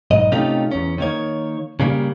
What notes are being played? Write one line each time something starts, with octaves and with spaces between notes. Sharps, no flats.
B1 G#2 D#5
C3 A3 C#4 D#4 F4 G4
E2 C#4
D#3 A#3 C#5
C#3 G3 A#3